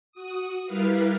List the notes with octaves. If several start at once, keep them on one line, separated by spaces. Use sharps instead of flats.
F#4 D#6
G3 E4 A#4 B4 F5